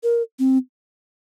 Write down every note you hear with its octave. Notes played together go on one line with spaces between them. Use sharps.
A#4
C4